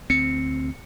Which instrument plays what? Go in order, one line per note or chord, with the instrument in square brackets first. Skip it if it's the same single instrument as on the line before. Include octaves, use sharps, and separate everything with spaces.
[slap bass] D2 C4 [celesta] C#7